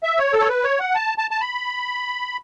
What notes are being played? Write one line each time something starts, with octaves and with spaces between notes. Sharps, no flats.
E5
C#5
A4
C#5
B4
C#5
F#5
A5
A5
A5
B5